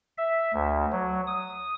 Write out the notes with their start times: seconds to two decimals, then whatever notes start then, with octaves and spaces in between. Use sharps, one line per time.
0.18 E5
0.54 D2
0.92 F#3
1.27 D#6